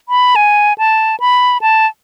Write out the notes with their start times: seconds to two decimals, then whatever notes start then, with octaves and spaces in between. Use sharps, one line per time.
0.09 B5
0.36 G#5
0.78 A5
1.20 B5
1.61 A5